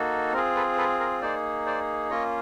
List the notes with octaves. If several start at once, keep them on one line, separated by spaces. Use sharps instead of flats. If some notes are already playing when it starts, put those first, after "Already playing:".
Already playing: A#3 D#4 F#4 A4
C4 F4 G#4 A#4
A4 B4
A4 B4
A#4
A#3 D#4 G#4 C5 D5
C5 D5
A#3 C#4 F4 C#5 D#5